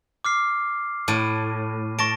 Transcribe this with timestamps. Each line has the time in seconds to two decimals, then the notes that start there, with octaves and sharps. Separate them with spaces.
0.24 D6 F6 C7
1.08 A2 D#7
1.99 A5 C#6 A#6 D7